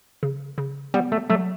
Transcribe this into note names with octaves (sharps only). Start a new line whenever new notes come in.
C#3
C#3
G3 B3
A3
F#3 A3